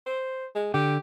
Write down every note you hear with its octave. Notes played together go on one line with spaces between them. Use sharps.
C5
G#3
D3 G4